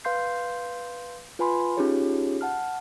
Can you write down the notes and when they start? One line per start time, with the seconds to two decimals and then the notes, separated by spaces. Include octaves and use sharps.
0.04 B4 F5 C6 G6 C7
1.39 F4 B4 G#5 B5 C6
1.77 C#4 D#4 F4 G4 G#4 C#5
2.41 F#5 A5 F6